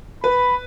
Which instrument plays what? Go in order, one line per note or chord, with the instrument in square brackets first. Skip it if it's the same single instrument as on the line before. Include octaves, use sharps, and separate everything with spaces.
[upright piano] B4 [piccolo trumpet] B5